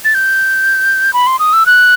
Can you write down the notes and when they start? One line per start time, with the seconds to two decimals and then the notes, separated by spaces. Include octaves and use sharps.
0.05 A6
0.15 G6
1.13 B5
1.27 C6
1.39 D#6
1.53 E6
1.66 F#6